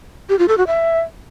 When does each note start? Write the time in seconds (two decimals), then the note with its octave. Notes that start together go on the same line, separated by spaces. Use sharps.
0.29 G4
0.39 F4
0.48 A4
0.58 F#4
0.67 E5